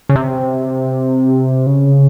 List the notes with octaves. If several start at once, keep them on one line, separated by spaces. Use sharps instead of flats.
C#3
C3
C#3